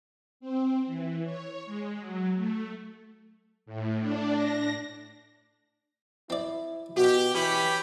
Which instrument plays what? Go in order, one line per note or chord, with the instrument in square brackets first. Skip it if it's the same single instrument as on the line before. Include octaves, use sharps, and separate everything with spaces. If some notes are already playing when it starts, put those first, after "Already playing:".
[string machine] C4
E3
C#5
G#3
F#3
A3
A2
D4
A#6
[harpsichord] C4 D5 [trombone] E4
[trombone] B2 [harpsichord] F#4 [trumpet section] G4
[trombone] E3 [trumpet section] C#4 B5 [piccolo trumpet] G4